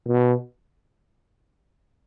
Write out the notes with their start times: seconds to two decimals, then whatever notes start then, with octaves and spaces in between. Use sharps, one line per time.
0.08 B2